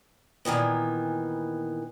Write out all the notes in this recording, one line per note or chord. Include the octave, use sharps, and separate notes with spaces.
A#2 D#3 E3 B3